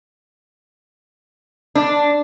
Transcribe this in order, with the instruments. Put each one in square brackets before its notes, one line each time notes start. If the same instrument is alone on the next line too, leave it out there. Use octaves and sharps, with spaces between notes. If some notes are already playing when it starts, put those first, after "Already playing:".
[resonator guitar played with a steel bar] D4